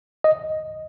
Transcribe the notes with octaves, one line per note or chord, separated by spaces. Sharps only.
D#5